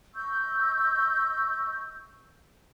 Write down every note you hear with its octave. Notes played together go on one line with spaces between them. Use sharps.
D#5 C#6 E6 G6